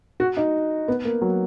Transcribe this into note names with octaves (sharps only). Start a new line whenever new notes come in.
F#4
D#4
B3
A#3
F#3